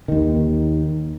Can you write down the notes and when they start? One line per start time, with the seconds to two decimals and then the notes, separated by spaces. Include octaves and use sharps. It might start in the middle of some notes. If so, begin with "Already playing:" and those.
0.08 D#2 D#3